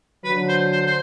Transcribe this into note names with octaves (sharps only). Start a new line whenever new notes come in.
D3 F#3 B4
C5
C5
C5